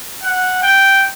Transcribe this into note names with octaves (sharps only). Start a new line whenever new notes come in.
F#5
G5